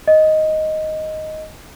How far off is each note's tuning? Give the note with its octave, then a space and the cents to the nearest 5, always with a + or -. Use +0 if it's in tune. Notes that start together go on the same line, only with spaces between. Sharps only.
D#5 +5